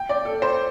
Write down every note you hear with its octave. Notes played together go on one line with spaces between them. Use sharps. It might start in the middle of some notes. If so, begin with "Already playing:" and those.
Already playing: G5
D5
A4
C5